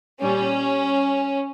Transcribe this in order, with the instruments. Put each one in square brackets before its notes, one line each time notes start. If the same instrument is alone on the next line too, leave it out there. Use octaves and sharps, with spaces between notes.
[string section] A#2 G3 C#4